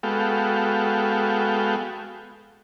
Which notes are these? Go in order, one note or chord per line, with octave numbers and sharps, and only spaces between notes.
G#3 B3 F#4 A4 F5 G5